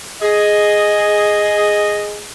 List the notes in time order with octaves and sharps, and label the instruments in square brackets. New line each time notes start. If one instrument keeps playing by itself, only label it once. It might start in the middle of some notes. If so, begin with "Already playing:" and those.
[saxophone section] G#4 [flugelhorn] D#5